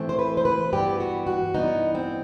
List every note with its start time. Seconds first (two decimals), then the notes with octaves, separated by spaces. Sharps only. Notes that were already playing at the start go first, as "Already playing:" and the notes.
Already playing: A2 E3 A3 C4
0.09 C5
0.19 B4
0.37 C5
0.45 B4
0.73 G2 E3 B3 G4
1.00 F#4
1.27 F#4
1.54 G2 E3 B3 D#4
1.95 C4